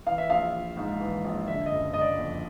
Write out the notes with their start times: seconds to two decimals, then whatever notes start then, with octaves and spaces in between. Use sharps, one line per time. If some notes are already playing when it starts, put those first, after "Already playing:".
0.06 E3 F5
0.18 E5
0.30 A#1 F5
0.54 A#1
0.77 G#2
1.00 E3
1.24 A#1
1.47 D3 E5
1.66 D#5
1.71 F#1
1.94 F#1 D#5
2.01 D5
2.18 F2